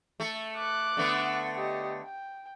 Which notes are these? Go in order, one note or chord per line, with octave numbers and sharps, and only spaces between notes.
A3 A4
D6 F#6
D3 A3 B3
G4 D#5
G5